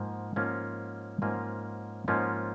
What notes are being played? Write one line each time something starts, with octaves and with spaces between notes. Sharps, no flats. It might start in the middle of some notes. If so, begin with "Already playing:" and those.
Already playing: G#2 F3 A#3
G#2 F3 A#3 C#4 F4
G#2 F3 A#3 C#4 F4
G#2 F3 A#3 C#4 F4